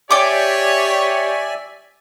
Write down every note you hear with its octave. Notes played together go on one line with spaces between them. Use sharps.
G4 C#5 D5 E5 G5 G#5 D6